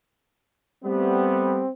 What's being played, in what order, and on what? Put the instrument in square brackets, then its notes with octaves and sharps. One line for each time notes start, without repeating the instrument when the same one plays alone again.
[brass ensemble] G3 A3 B3 [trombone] C4